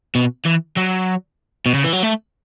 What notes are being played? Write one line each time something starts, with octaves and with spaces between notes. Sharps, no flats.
B2
E3
F#3
B2
C#3
E3
F#3
A3